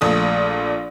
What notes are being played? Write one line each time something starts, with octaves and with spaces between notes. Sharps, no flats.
A#1 A#2 A3 D#6